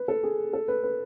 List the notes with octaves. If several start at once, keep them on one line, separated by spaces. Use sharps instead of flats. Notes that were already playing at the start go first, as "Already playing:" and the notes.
Already playing: B4
A4
G#4
A4
B4
B4